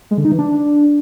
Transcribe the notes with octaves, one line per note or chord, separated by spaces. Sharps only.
G#3
D3
D#4
E3
D4